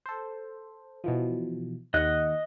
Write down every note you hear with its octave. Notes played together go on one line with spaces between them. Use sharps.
A4 C5
B2 E3 F3
D#2 D#5 F#5 F#6